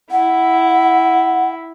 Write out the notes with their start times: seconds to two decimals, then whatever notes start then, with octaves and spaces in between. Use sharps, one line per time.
0.11 E4 F#5